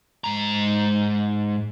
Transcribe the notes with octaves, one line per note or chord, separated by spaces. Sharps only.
G#2 A#5